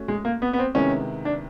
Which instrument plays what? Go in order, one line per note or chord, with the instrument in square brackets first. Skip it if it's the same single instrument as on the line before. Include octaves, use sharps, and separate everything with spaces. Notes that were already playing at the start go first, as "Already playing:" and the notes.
Already playing: [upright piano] A3 C#4 F#4
[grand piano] G#3
A#3
B3
B3
C4
[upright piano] C3 D#3 G#3 B3 E4 [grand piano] C#4
[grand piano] D4